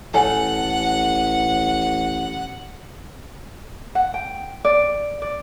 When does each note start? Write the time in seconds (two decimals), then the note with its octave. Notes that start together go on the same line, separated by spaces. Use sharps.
0.14 A1 A4 B4 C#5 F#5 G#5
3.95 F#5
4.14 G5
4.65 D5
5.22 D5